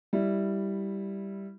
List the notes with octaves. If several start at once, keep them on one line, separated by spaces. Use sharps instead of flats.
G3 E4